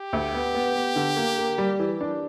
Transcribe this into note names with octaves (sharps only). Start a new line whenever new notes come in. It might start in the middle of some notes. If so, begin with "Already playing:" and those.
Already playing: G4
D2
B3
B3
B3
D3
A#3
A#3
G3
E3
D4